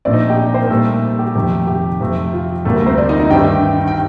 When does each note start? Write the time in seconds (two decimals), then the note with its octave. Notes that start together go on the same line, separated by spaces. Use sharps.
0.05 A#2 F3 A3 C4 D4 D5
0.13 D#4 D#5
0.30 G4 G5
0.54 C5
0.62 A#4
0.70 A#2 G3 A3 A#3 A4
1.19 G4
1.35 F2 C3 D#3 A3 G4
1.67 G4
2.01 F2 C3 F3 A3 C4
2.33 F4
2.65 D2 C3 G3 A3 A#3 A4
2.76 A#3 A#4
2.86 C4 C5
2.98 D4 D5
3.09 D#4 D#5
3.20 D#4 D#5
3.30 G2 D#3 A3 C4 G4 G5
3.88 G5